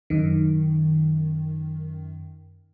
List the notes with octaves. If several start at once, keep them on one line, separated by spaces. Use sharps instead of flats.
F#2 D#3